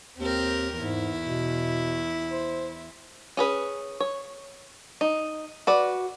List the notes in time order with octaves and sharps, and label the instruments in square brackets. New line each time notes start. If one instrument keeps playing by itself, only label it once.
[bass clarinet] D#2 [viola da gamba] C4 G4 A#4
[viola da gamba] E2 E4 [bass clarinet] G#2
[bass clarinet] B2
C5
[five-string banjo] C#4 G#4 B4
C#5
D#4
F#4 B4 D5